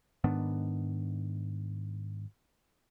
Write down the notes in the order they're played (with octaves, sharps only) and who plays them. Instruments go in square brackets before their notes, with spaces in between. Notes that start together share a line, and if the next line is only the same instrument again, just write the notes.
[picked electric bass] G#2 D#3 B3 D4